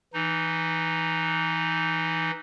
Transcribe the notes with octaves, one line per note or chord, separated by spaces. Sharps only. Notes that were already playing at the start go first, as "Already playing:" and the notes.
E3 D#4